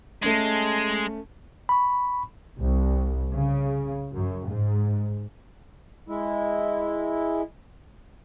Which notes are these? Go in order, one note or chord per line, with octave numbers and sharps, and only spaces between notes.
G#3 A3 C#4
B5 C#6
C2
C#3
F#2
G#2
G#3 E4